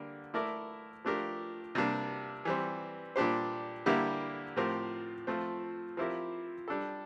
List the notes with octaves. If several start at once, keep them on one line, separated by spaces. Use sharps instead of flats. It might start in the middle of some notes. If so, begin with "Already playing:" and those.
Already playing: D3 G3 A#3
A3 E4 A#4 D5
F3 A3 D4 G4 A#4
C3 G3 A#3 D4
E3 G3 C4
A#2 G3 D4 G4 C5
D3 G3 A#3 E4 G4
A2 F3 C4 G4 A#4
F3 A3 C4
F3 C4 E4 G4 A#4
G3 D4 A4